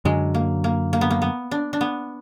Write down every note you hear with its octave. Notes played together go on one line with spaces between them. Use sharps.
F#2 D3 F#3 G#3
A#3
A#3
A#3
B3
A#3
B3
D4
D4
B3